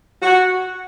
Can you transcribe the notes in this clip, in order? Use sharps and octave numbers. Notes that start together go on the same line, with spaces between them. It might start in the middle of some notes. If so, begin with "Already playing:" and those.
F#4